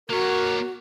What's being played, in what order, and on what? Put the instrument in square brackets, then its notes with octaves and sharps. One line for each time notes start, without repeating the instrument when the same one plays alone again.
[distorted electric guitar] A#3 C#5 [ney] F#4 [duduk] A#4